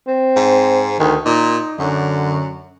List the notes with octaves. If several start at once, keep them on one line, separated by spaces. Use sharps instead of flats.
C4
G#2
D2 D#3
A#2 D#4
F#2 D3